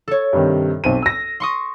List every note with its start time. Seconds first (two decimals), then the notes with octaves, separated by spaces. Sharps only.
0.08 A4 C#5
0.33 G2 C3 D#3
0.84 B1 C4 D#7
1.02 E6 A#6
1.40 C6 C#6 D#6